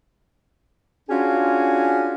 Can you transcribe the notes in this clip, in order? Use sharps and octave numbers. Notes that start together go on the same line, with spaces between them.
C#4 D4 F4 F#4 G#4